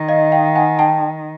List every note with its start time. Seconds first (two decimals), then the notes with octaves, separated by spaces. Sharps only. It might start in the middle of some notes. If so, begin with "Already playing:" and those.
Already playing: D#3
0.08 D#5 F5
0.32 F5 G5
0.55 F#5 G#5
0.79 G5 A5